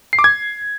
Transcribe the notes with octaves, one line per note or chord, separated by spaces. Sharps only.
C7
D6
G#6